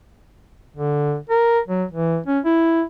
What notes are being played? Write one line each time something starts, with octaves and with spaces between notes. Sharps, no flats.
D3
A#4
F#3
E3
C#4
E4